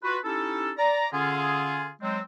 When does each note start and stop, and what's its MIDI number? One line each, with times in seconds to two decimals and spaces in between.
0.04 0.18 65
0.04 0.18 66
0.04 0.18 71
0.24 0.71 61
0.24 0.71 63
0.24 0.71 64
0.24 0.71 67
0.24 0.71 69
0.78 1.08 74
0.78 1.08 82
1.13 1.91 50
1.13 1.91 61
1.13 1.91 65
1.13 1.91 68
2.02 2.20 54
2.02 2.20 56
2.02 2.20 60